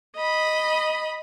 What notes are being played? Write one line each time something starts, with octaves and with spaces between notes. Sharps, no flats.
D#5 B5